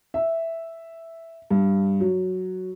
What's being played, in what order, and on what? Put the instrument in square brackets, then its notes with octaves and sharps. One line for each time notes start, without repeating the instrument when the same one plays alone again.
[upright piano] E5
G2
F#3